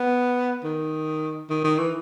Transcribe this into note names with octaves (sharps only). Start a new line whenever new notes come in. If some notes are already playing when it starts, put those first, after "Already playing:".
Already playing: B3
D#3
D#3
D#3
E3